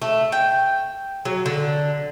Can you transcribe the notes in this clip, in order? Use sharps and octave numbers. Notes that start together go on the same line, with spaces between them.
A3
G5
F#3
D3